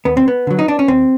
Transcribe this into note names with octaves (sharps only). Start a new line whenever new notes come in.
D#2 B3
C4
B3
D3 F#3
D#4
D4
C#4
D#2 C4